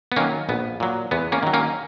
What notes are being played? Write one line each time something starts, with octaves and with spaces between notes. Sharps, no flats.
B3
D#3 F#3 A#3 C#4
A#1 B3
A#2 F#3
E2 B3
A#3 C#4
D#3 F#3
A#3 C#4